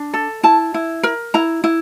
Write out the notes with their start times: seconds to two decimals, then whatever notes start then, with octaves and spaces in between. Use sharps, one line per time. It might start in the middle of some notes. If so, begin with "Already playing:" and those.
Already playing: D4
0.14 A4
0.43 E4 A5
0.74 E4
1.03 A#4
1.34 E4 A#5
1.64 E4